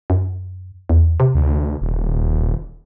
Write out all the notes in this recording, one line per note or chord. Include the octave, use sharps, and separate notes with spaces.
F#2
E2
C3
D2
D#1